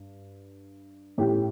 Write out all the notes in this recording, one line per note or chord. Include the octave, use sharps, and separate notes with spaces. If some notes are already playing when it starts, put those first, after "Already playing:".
Already playing: G2
A1 A2 E3 G4